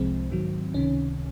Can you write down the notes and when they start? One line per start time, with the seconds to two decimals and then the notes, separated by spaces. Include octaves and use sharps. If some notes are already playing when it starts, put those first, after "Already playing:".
Already playing: C2 C3 F3 G#3 C4
0.31 G#2 D#3 F#3
0.74 C#2 C3 D#3 C#4